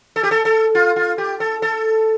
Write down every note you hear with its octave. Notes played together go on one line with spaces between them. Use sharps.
A4
G4
A4
A4
F4
F4
G4
A4
A4